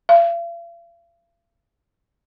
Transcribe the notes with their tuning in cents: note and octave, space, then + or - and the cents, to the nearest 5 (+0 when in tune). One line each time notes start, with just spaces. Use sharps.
F5 -45